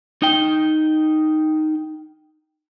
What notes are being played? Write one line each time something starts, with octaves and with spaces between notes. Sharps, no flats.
D#4 G5